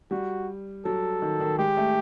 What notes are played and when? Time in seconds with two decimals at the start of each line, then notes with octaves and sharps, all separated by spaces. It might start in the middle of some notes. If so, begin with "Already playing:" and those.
0.11 G3 F#4
0.85 F#3 A4
1.22 D#3
1.40 D#3
1.58 G#3 G4
1.77 A3